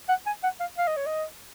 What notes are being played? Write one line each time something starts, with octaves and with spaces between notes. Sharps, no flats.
F#5
G#5
F#5
F5
F5
D#5
C#5
D#5